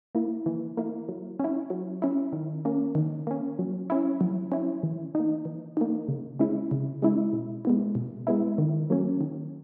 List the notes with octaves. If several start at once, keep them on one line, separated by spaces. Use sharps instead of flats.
A#3 E4
E3
A#3 E4
F#3
C#4 E4
F#3
C#4 E4
D#3
A#3 C#4
D#3
A#3 C#4
F#3
C#4 E4
F#3
C#4 E4
E3
A#3 D#4
E3
A#3 D#4
C#3
G#3 C#4 E4
C#3
G#3 C#4 E4
B2
G#3 B3 E4
B2
G#3 B3 E4
D#3
F#3 A#3 C#4
D#3